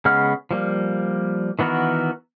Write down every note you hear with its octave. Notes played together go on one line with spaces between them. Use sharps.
C#3 G#3 B3 F#5 F6
F3 G3 A#3
D#3 E3 B3 F#4 A#4